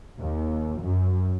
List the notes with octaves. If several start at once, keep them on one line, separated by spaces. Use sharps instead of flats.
D#2
F#2